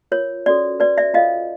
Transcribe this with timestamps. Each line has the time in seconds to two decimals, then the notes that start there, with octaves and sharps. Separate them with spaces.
0.12 F4 A#4 C#5
0.46 C#4 F#4 A4 D5
0.80 F#4 B4 D5
0.98 D5 E5
1.14 F4 A4 C5 D#5 F5